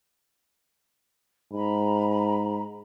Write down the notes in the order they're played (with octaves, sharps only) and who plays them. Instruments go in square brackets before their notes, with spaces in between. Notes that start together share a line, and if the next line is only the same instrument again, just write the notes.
[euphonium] G#2 [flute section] A#5 B5